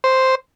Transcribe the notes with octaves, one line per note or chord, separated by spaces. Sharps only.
C5